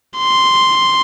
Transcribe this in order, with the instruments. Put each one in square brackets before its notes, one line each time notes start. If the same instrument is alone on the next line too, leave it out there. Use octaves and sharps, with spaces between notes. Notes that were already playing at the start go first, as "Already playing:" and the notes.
[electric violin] C6